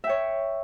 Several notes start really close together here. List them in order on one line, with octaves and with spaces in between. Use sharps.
E5 G5 C#5